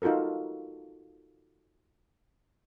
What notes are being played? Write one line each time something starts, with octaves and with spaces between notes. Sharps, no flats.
D#4 F4 F#4 A4 A#4